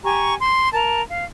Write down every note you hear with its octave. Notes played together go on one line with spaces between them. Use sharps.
G4 G#5 A#5 C#6
C6
A#4 A5
F5